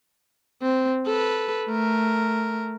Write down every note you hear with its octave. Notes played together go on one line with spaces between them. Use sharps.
C4
A4 B4
A3 A#4